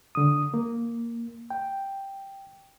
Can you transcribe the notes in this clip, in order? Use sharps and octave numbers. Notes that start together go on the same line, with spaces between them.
D3 D#6
A#3
G5